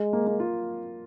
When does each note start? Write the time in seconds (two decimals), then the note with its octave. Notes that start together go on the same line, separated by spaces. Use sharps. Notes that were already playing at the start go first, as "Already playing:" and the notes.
Already playing: G#3
0.13 A#3
0.27 A#3
0.40 F4